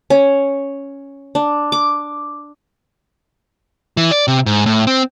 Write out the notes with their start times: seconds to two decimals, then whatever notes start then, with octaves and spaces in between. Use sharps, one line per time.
0.10 C#4
1.35 D4
1.72 D6
3.97 E3
4.11 D5
4.28 C3
4.46 G#2
4.66 A2
4.87 C4